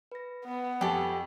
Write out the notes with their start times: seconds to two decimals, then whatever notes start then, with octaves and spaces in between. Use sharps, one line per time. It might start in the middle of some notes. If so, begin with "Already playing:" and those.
0.12 B4 A#6
0.45 B3
0.81 F2 G4 A4 G#5 C#6